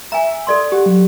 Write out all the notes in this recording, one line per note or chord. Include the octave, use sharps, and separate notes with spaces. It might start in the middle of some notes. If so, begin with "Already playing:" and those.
E5 G#5 A#5
A4 D5 C6
G4 F#5
F#3